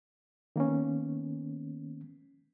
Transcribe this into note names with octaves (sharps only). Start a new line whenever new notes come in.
D#3 A#3 B3 C#4